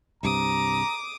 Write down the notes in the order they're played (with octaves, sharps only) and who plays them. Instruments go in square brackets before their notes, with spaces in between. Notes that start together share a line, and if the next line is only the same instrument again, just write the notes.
[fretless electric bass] C2 G2 C3 [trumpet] A#5 [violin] D6 D#6